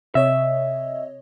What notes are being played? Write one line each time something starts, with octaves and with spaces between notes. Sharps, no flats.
C3 C#5 D#5 E5